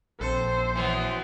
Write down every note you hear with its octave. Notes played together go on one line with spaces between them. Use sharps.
A#1 C4 A4 C5
E3 F#3 B3